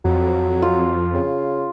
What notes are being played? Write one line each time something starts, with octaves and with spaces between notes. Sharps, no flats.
F2 F#3
F4
C#3